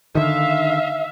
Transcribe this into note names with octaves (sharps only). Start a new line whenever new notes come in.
D3 D#3 E5 F5